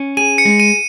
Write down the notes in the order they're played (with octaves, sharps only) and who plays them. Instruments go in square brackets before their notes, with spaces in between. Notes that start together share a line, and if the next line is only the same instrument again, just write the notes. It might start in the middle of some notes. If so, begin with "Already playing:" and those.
Already playing: [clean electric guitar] C#4
[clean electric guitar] G#4 [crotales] D#7
[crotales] C#7
[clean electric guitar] G#3
[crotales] D#7